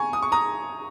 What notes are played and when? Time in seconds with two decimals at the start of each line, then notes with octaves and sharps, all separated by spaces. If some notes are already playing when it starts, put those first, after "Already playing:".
Already playing: G#5 A#5 C#6
0.13 D#6
0.22 C#6
0.32 A#5 D#6